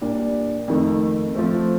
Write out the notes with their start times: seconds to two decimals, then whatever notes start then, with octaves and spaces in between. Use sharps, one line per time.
0.01 A#2 G3 A#3 D4 G4
0.68 F2 D#3 A3
1.35 F3 A3 C4